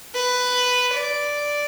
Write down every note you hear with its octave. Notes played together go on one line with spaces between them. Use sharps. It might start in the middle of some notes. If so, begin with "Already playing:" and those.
B4
D5